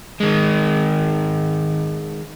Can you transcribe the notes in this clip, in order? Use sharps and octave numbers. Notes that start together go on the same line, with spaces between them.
D#3 G#3